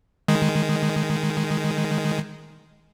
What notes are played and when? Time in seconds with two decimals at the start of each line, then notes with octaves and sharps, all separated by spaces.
0.28 D#3 G#3